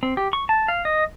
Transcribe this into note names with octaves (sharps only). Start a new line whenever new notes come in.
C4
G4
C#6
A5
F5
D#5